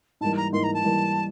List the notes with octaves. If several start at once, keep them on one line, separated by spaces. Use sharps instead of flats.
G#2 E3 G3 A#3 A5
A#5
G#2 E3 G3 A#3 C6
A#5
A5
G#2 E3 G3 A#3